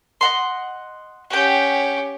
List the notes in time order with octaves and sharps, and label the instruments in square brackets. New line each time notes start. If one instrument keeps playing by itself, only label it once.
[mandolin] D#5 F#5 C6
[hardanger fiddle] C#4 G4 [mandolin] F#5 G5